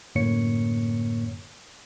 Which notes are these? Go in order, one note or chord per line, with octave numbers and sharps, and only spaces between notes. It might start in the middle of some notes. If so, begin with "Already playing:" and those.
F#2 A2 D3 A#3 C#5 C#7